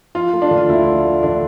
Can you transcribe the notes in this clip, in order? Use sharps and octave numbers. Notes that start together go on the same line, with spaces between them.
F3 F4
A3
D4
D3
F4
D2 E4
F3
A3
D3 D4